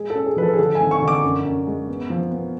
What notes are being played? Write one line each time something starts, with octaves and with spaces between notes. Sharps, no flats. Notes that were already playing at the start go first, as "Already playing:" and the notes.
Already playing: G#3 G#4
C#4 A4
G#4
F3 B4
A4
G#4
D3 A4
G#5
G#1
C#6
D3
D6
F#2
F#2
G#3
B3
F3
B3